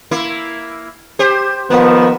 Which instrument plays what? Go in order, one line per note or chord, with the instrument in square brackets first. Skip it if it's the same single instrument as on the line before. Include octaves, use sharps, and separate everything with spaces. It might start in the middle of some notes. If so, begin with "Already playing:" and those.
[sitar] A#3 E4
G4 C5
[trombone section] D#3 F3 B3 [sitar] A#3